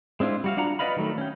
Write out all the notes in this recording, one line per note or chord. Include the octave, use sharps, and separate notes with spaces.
G#3 C4 D4 E4 F4
G3 F#4 F5
D4 F4 F#5 A#5
B4 D5 D#5 F5 B5
D#3 F#3 A3
C#4 G5